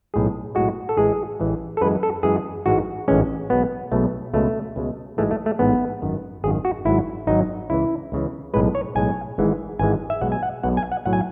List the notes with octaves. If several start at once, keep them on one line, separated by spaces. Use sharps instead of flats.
B1 A2 G#3 G#4
B1 A2 G#3 F#4
A4
A1 A2 E3 G#3 G#4
A1 A2 E3 G#3
A4
F#2 E3 G#3 B4
A4
F#2 E3 G#3 G#4
A1 G#2 E3 G#3 F#4
A1 G#2 E3 G#3 C#4
B1 B2 G#3 B3
B1 B2 G#3 A3
C#2 B2 G#3 A3
C#2 B2 G#3
A1 G#2 E3 G#3 A3
A3
A3
A1 G#2 E3 G#3 B3
G#1 F#2 D#3
G#1 F#2 D#3 G#4
F#4
G#1 G#2 F#3 E4
G#1 G#2 F#3 D#4
C#2 C#3 E3 E4
C#2 C#3 E3
B1 A2 G#3 B4
C#5
B1 A2 G#3 G#5
G#1 G#2 E3 G#3
G#1 G#2 E3 G#3 G#5
E5
B1 B2 G#3 F#5
G#5
F#5
B1 B2 G#3 F#5
G#5
F#5
B1 A2 F#3 F#5
G#5